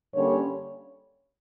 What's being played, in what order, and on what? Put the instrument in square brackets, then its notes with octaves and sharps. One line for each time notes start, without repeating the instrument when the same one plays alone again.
[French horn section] G2 D3 G3 A#3 C#4 C#5